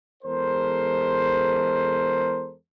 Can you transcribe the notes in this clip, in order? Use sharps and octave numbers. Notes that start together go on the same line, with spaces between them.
E2 G#3 A4 A#4 C5